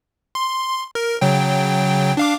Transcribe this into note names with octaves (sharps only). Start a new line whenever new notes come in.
C6
A#4
C#3 F#3 G5
D4 F5 D6